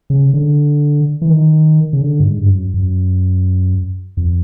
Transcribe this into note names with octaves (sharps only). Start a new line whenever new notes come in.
C#3
D3
E3
D#3
C#3
D3
G2
G#2
G2
F#2
F#2
F2